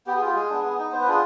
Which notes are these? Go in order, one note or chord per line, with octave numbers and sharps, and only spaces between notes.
B3 G4
G#4
F4 G4
G#3 G#4
B3 D4
B3
D#4
B3 C5
B4
D4 F4 G#4